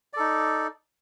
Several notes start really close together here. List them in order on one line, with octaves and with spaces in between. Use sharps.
D5 A4 D#4